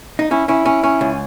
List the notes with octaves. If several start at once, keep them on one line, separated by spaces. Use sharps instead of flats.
D#4
C#4 E4
C#4 E4
C#4
C#4
C#2